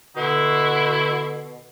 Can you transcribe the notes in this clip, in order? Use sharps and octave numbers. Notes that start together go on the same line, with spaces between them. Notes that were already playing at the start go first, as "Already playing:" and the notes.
B2 D3 E4 F#4